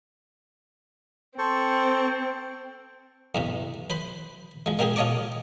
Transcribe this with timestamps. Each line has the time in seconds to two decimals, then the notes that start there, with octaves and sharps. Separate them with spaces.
1.38 C4 A4 C5 C#6
3.35 E2 G2 C3
3.90 B4 C5 B5
4.66 F3 G#3
4.79 G#3 A#3 C4 G4 G#4
4.96 F4 C#5 D#5 A5 C#6 D6